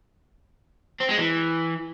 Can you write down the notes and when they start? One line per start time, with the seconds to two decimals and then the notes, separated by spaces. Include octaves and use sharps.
1.01 C4
1.09 G#3
1.18 E3